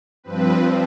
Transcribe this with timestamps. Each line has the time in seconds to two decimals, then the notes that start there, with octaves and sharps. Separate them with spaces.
0.24 G2 F3 C4 B4